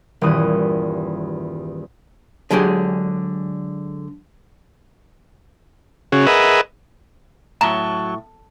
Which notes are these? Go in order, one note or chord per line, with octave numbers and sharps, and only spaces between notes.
D#1 E2 G2 D#6 F#6
D3 F#3 G#3 G4 G#4
C#3 C#4 F#4 G#4
G#4 A#4 B4 D#5 E5 F#5
A2 F#3 A5 A#5 C#6